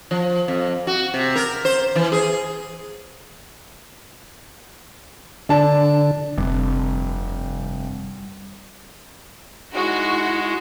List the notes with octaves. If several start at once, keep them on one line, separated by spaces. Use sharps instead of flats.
F3
F2
F#4
C3
A#4
C5
E3
G#4
D3 D4 A5
F1 G2 C3
G#3 D#4 E4 F#4